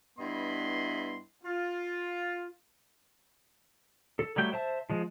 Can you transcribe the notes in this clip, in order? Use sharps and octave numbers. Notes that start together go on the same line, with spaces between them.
G2 B3 E4 D#5 B5 C6
F4
A4
F#3 G3 A3 G5 G6
C5 E5 A5
F3 G#3